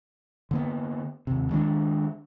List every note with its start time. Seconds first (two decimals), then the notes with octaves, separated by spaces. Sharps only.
0.51 D3 A#3 B3
1.27 D#2 C3
1.51 D#3 G#3 C#4 D4